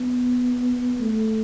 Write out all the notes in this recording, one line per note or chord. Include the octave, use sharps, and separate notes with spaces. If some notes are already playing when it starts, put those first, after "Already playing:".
Already playing: B3
A3